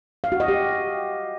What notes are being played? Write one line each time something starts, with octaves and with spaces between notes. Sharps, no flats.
F5
F#4
D#5
G4